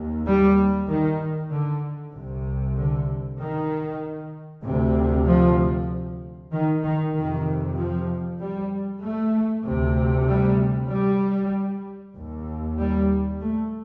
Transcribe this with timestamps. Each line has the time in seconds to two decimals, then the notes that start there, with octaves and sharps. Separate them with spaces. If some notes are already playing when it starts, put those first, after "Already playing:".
Already playing: D#2
0.26 G3
0.89 D#3
1.51 D3
2.14 C2 C3
2.77 D3
3.40 D#3
4.65 D2 C3
5.27 F3
6.52 D#3
6.84 D#3
7.15 F2 C3 D#3
7.78 F3
8.41 G3
9.03 A3
9.66 D2 C3
10.28 G3
10.91 G3
12.16 D#2
12.79 G3
13.42 A3